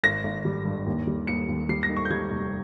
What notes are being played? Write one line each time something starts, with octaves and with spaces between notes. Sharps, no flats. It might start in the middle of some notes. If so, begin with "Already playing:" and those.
G#1 A#6
G#1
G3
G2
D#2
G3
D#2 C#7
D#2
G3 C7
A#6
D#3
C#6
G6
G3 G#6
F1